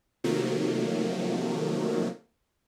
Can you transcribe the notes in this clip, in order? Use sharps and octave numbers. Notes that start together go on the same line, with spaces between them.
C3 D#3 F3 F#3 A3 A#3